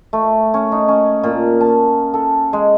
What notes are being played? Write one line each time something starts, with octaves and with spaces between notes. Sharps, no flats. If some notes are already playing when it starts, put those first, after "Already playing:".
A3
C#4
D#4
C#4
A#2
A5
A4
G#3